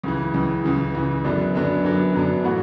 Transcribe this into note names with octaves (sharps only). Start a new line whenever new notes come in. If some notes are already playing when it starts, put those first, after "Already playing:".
C#2 C#3 E3
C#2 C#3 E3
C#2 C#3 E3
C#2 C#3 E3
F#2 D3 F#3 B3 D4
F#2 D3 F#3 B3 D4
F#2 D3 F#3 B3 D4
F#2 D3 F#3 B3 D4
A2 E3 B3 F#4